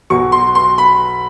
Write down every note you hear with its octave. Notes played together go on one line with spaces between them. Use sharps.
B1 B2 F#3 C#6
C6
C6
B5